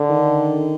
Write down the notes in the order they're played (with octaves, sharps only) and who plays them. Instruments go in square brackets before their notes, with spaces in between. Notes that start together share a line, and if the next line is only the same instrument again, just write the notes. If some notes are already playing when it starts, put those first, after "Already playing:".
Already playing: [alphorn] D3
[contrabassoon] D#3